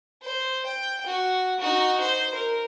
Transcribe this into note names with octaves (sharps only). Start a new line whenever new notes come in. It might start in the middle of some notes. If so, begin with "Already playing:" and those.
C5
G5
F#4
D#4 F#4
C5
A#4